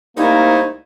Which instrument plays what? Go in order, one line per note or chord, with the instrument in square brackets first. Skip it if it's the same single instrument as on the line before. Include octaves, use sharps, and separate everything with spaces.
[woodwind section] C2 A3 E4 [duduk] A#3 [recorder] D#4